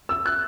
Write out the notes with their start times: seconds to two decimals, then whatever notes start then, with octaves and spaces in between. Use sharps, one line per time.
0.09 E6
0.26 F#6